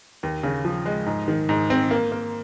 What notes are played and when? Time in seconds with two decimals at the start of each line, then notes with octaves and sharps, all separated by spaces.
0.23 D#2
0.43 C#3
0.65 F3
0.86 G#3
1.06 G#2
1.28 D#3
1.49 G#2
1.70 C4
1.91 A#3
2.12 A#3